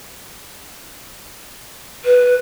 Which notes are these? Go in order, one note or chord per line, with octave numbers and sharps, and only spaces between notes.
B4